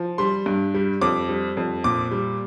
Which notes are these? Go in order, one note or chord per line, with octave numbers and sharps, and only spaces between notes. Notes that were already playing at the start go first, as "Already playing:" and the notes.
Already playing: F3
G3 C6
G2
G3
F2 D6
G3
F2
A#2 D6
G3